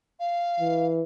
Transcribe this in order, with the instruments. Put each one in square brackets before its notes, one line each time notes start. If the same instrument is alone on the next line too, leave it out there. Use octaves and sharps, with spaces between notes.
[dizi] F5
[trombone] E3